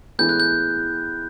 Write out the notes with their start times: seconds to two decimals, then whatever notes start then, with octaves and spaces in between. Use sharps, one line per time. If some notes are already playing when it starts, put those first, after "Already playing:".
0.19 A2 E3 G#3 B3 G6
0.29 F#6
0.40 G6